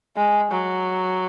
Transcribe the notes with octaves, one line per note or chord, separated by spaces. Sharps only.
G#3
F#3